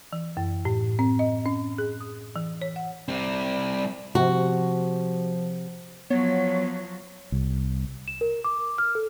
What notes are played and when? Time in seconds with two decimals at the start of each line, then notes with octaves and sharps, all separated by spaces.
0.13 E3
0.37 F#2
0.65 A2
0.99 C4
1.19 D#5
1.46 C#4
1.78 G#4
2.01 D#6
2.36 E3
2.62 C#5
2.76 F#5
3.08 G3 C4
4.15 C3 F3 F#4
6.10 F3 F#3 B3 C#5
7.32 C2
8.08 E7
8.21 A#4
8.44 D6
8.78 F6
8.95 A4